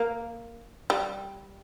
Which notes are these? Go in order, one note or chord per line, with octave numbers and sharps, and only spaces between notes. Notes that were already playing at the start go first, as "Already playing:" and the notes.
Already playing: A#3
G3